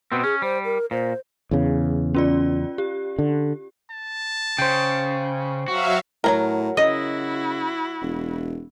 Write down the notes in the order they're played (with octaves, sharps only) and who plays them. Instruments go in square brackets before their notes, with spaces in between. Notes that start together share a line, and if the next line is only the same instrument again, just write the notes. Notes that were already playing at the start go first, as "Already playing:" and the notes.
[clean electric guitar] B2 B3 C4
[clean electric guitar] C#4 [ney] G#4
[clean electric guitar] G3 [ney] C5
[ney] A#4
[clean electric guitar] A#2 [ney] C5
[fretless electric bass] E2 C#3
[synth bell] C#4 F4 D5
G4
[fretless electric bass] D3
[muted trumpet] A5
[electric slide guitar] C#3 [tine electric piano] C5 G5
[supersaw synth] F#3 E5 F5 [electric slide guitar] F#4
[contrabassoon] A2 [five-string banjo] F#3 A#3 A#4
[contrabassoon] C#3 [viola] E4 F#4 [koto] D#5
[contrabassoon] E1